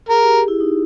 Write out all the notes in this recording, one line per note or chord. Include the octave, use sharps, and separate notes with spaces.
G#4 A#4
G4
G4
E4
D#4